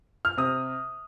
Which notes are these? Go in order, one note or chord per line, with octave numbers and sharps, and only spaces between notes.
F6
C3 D#6